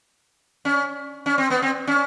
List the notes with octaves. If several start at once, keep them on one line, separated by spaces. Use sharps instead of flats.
C#4
C#4
C4
B3
C4
C#4